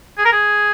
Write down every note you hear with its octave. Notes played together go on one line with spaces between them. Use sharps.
G#4
A#4
G#4